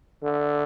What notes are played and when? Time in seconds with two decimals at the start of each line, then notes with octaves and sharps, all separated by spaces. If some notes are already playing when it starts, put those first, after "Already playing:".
0.23 D3